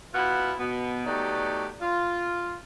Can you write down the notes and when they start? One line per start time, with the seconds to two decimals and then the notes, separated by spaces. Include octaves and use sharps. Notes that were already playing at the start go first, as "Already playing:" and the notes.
0.15 B2 E4 F4 F#5
0.59 B2 B3
1.06 F#3 A3 B3 D#4 G4 D5
1.82 F4